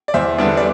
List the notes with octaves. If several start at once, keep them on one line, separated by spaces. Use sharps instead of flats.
D5
E2 C5 E5
D3 G3 B3 D4
D5